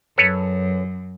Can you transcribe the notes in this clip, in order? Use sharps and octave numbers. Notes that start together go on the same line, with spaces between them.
F#2 A4 B4 C#5